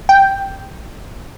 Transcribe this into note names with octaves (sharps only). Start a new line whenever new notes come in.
G5